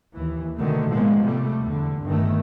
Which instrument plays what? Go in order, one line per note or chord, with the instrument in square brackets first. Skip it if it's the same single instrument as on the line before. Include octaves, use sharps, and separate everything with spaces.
[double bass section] D#2 E3
B2 D3 D#3 A3
A2 F3 G#3 A#3 B3
C3 G3 A3
E2 D3
G1 G2 D#3 A3